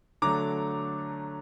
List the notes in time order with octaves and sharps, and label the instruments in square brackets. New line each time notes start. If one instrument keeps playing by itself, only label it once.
[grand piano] D3 F#3 A3 A#5 D6